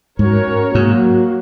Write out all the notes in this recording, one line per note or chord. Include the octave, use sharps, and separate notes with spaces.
G#2 C#4 F#4 A#4 C#5
G#2 F#3 A#3 F#4